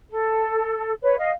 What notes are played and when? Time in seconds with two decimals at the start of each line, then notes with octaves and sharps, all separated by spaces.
0.10 A4
1.02 B4 C#5
1.17 D#5 F5